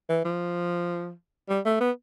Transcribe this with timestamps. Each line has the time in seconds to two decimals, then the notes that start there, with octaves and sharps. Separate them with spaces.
0.09 E3
0.25 F3
1.49 G3
1.65 A3
1.80 B3